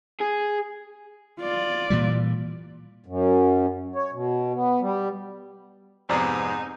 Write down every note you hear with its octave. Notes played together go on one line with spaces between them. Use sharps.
G#4
F4 D5
A#2 E3 G3
F#2
C#5
B2
B3
G3
F2 G#2 C3 B3 D#4 C5 D5 A#5